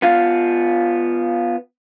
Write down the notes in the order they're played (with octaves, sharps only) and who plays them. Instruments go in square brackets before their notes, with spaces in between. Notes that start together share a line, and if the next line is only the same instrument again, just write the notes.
[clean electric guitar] B3 F4 F5